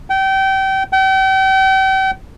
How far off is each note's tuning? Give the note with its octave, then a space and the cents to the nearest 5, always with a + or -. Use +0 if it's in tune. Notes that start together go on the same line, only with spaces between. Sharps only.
G5 -30
G5 -40